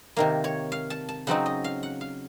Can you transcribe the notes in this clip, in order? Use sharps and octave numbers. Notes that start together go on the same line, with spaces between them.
C3 D#3 A#3 F5
C#5
F5
A5
A5
C#3 F#3 C4 D#4 F#5
D#5
F5
F#5
F5